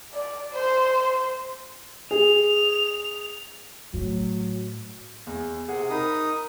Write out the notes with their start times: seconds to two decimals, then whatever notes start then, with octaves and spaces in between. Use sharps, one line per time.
0.13 D5
0.52 C5
2.11 G#4 F7
3.94 A2 F#3
5.27 E2
5.68 C3 G#4 F#5
5.90 D#4 A#4 B5 D#6